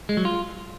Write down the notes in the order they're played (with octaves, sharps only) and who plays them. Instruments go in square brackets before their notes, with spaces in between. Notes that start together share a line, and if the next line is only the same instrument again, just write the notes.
[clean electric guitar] G#3
F#3
F4